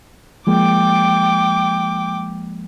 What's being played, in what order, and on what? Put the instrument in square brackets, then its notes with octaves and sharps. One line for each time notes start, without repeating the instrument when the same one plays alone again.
[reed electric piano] F3 G#3 A#3 [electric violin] G5 D6